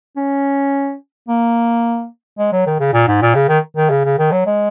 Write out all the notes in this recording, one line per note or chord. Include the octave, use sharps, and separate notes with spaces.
C#4
A#3
G#3
F#3
D#3
C#3
A#2
G#2
A#2
C#3
D#3
D#3
C#3
C#3
D#3
F#3
G#3